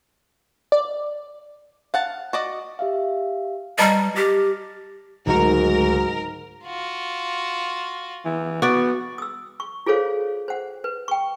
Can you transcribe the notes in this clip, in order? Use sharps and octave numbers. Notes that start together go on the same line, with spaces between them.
D5
F5 F#5 A5
F#4 D5 D#5
G4 E5 F5
G3 B4 D#5 A5 A#5
G4 F6 A6 A#6
C#2 G#2 D3 F#3 A3 D#4 F#4 A#4
F4 F#4
E3
B3 F#4 D5
D#6 E6
C#6
F4 G#4 A4 C5 C#5 F5
C5 F#5
B4
G5 C#6